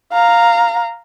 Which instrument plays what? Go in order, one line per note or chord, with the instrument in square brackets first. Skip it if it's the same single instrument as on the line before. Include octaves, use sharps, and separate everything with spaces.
[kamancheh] F5 A#5